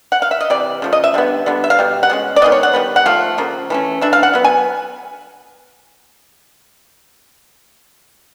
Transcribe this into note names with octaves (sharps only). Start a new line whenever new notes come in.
F#5
F5
E5
D#5
C3 E3 D5
C#3 F3 A3
D#5
E5
D3 G3 B3
D3 G3 B3
E5
F5
B2 G3
F#5
B2 G#3 C#4
D5
D#3 G#3 B3 D#5
C#5
F#5
D#3 G3 B3
F#5
F3 A3 F5
C#3 F3 A#3
E3 A3 C#4
E3 A3 D4 E5
F5
F#5
F#3 B3
G#5